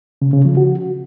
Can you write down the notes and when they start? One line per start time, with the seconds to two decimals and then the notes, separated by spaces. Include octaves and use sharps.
0.22 C#3
0.33 C#3
0.45 F3
0.57 F#4